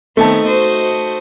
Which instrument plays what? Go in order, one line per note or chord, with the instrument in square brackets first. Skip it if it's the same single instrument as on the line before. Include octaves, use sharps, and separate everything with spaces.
[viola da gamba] D#3 B3 C4 [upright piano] A3 D#4 A5
[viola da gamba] F#4 C5 D#5